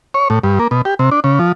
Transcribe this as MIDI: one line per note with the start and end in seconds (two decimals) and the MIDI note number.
0.14 0.28 73
0.30 0.39 45
0.43 0.59 43
0.59 0.68 58
0.71 0.82 47
0.85 0.94 67
0.99 1.10 48
1.11 1.20 62
1.24 1.39 49
1.39 1.52 53